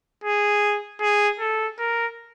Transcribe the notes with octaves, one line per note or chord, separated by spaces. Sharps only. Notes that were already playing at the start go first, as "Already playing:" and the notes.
G#4
G#4
A4
A#4